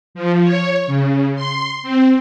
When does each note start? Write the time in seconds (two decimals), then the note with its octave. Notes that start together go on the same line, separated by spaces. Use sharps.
0.15 F3
0.44 C#5
0.87 C#3
1.36 C6
1.83 C4